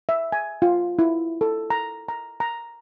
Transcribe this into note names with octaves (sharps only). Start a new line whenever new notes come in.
E5
G#5
F4
E4
A4
A#5
A#5
A#5